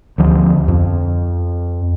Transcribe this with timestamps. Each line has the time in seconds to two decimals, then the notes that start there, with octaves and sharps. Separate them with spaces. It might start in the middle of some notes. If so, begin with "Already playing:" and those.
0.18 D2 F3
0.68 F2